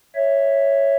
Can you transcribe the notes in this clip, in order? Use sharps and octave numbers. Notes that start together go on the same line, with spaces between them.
C#5 E5